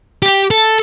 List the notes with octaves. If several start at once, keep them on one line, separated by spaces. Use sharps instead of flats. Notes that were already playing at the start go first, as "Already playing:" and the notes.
G4
A4